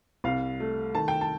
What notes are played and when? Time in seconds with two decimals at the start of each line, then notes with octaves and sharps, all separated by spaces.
0.24 C2 F5
0.60 A3
0.95 D#3 A5
1.08 G5
1.21 A5